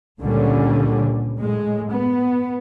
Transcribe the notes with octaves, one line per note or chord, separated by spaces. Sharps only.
C#2 A#2 D3 G3 C#4
A2 G#3
B3